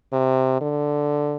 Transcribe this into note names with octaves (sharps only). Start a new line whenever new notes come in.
C3
D3